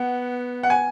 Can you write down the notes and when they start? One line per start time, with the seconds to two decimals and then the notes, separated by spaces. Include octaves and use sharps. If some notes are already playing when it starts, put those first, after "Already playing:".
Already playing: B3 F#5
0.63 F#5
0.70 G#5